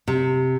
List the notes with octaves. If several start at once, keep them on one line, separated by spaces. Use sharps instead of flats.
C3